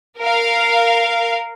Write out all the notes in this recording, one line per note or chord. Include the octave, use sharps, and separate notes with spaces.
A#4 F5